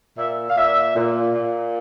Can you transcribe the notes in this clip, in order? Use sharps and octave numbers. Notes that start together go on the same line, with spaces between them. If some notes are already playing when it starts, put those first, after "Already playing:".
A#2 E5
F5
A#2 E5
A#2
A#2